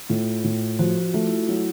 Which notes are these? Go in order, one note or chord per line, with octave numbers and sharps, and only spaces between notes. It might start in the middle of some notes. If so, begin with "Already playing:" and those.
A2 F4
A2
F3 F#4
F4
A3
E4
F#3 E4